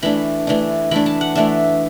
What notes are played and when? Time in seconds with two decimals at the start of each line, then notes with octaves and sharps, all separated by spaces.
0.02 E3 A3 D4 B5
0.47 E3 A3 D4
0.91 E3 A3 D4 B5
1.06 A5
1.21 F#5
1.35 E3 A3 D4 E5